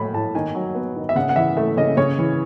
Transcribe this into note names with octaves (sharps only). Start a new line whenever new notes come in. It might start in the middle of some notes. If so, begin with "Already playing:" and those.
Already playing: A2 F#3 A3 B5
A2 A5
D#3 G#5
F#3
B3
D#3
E5
C#3 F#5
F#5
E3 E5
A3 E5
C#3 D#5
C#3 C#5
E3